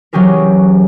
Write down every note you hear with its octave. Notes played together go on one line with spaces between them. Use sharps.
E3 F#3 C#4 G4 G#4 A#4